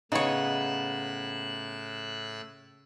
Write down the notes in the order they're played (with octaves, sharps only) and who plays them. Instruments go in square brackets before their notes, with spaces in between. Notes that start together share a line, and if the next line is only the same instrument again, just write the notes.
[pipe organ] A2 E6 F#6 [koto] C#3 C#5 [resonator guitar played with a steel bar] B3 D#4